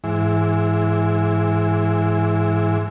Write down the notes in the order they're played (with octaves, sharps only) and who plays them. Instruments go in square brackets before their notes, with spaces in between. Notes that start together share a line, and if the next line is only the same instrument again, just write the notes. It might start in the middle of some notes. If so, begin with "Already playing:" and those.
[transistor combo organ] G#2 E3